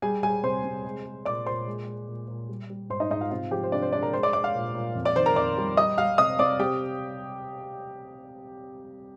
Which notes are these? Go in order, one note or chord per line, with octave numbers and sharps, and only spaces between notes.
G3 G#4 G#5
G3 G#4 G#5
C3 C5 C6
C3
G#3
G#3
A#2 D5 D6
A#2 C5 C6
G#3
G#3
A#2
A#2
G3
G3
G#2 C5 C6
D#4 D#5
G#2 D#4 D#5
F4 F5
C3 F4 F5
F3 G4 G5
C5
C3 D4 D5
C5
G#3 D4 D5
A#4 A#5
G#3 C5 C6
D5 D6
G#3 D5 D6
F5 F6
A#2
A#2
F2
D5 D6
D#3 C5 C6
A#4 A#5
F2 D5 D6
G3
G3 D#5 D#6
G3 F5 F6
C3 D#5 D#6
C3 D5 D6
C3 G4 G5